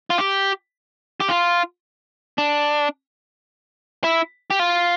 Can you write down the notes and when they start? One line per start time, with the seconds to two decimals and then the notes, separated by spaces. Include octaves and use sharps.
0.10 F4
0.18 G4
1.20 G4
1.29 F4
2.38 D4
4.04 E4
4.50 G4
4.59 F4